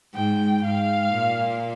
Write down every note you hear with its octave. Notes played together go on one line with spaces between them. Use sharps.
G#2 G5
G#2 F5
A#2